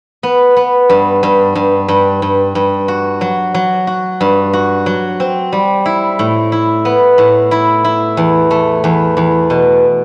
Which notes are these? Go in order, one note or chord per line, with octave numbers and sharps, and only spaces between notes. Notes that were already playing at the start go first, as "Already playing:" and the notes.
B3
B3
G2
G2
G2
G2
G2
G2
F#4
F#3
F#3
F#4
G2
F#4
F#3
C4
G3
E4
A2
E4
B3
A2
E4
E4
E2
A3
E2
E2
B2